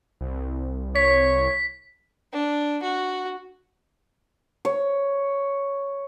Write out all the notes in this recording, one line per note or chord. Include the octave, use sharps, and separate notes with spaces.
C2
C#5 B6
D4
F#4
C#5